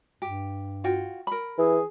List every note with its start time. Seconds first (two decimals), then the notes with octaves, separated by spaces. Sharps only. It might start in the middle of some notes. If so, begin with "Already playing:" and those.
0.22 G2 G4
0.84 F4 F#4 G5
1.27 A#4 B5
1.58 E3 G#4